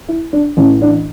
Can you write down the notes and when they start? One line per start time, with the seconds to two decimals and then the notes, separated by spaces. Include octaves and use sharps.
0.08 E4
0.33 D4
0.57 A1 A2 E3 C#4
0.82 D4